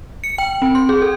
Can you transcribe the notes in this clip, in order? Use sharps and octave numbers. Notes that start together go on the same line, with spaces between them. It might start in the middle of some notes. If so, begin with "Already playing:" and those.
C#7
G5
C4
C6
G#4
A4